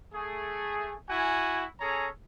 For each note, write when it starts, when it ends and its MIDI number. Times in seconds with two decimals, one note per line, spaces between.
0.14 0.95 57
0.14 0.95 68
1.08 1.64 64
1.08 1.64 66
1.08 1.64 80
1.80 2.08 61
1.80 2.08 68
1.80 2.08 69
1.80 2.08 73
1.80 2.08 82